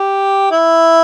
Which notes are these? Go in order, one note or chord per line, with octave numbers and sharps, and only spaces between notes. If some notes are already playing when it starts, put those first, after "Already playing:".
Already playing: G4
E4